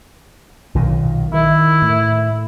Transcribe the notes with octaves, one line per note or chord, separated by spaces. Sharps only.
B1 A#2 D#3
D#3 E4
A2